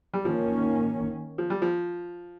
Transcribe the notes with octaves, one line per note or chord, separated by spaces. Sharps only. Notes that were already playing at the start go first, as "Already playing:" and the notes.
G3
D#3 F3 A#3 C#4
F3
G3
F3